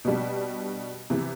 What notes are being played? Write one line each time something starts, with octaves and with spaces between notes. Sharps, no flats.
B2 G3 D4
C3 E3 B3